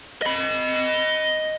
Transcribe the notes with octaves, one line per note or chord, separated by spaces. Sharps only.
D#5 B5